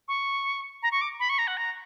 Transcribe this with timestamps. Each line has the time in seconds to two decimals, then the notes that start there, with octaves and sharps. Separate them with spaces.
0.08 C#6
0.83 A#5
0.92 C#6
1.01 D6
1.20 B5
1.29 C#6
1.38 A#5
1.47 F#5
1.57 A#5